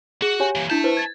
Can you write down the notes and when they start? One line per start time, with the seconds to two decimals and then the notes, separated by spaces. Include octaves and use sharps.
0.22 F#4 G#4
0.40 G4 C#5 G#5
0.55 E3 A#3
0.70 D4 E4 E5 A5 G6
0.84 E4 B4 C5
0.97 G#6 A6